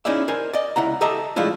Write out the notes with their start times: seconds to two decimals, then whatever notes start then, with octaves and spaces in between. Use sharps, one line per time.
0.05 C#4 D#4 E4 G#4 D5 E5
0.28 A#4 C5 G#5
0.53 D5 D#5
0.76 C#2 E4 F#5 A#5
1.01 G4 A4 D#5 E5 A5 A#5
1.36 F3 G#3 A3 D4 E4 F4